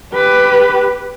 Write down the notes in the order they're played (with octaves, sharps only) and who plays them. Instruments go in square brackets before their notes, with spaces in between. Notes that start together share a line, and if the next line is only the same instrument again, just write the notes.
[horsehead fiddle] G4 B4